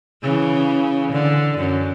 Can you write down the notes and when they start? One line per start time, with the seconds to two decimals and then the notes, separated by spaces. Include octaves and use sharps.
0.23 C#3 E3
1.12 D3
1.58 F#2